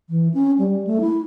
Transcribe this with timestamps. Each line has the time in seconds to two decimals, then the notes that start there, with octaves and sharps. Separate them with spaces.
0.10 E3
0.34 C#4
0.59 G3
0.87 A3
1.01 E4